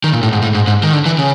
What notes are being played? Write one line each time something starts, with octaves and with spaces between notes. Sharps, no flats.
D#3
A#2
A2
G#2
A2
G#2
G#2
D#3
D3
E3
C#3